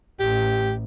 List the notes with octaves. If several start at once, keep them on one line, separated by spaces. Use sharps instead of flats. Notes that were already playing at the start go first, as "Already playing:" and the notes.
A1 G4